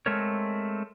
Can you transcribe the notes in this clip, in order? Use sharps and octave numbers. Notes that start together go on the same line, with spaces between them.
G#3 A3 C4 A#4 C#5